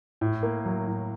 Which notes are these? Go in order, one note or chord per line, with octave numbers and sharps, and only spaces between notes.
A2
A#3
F#3
A2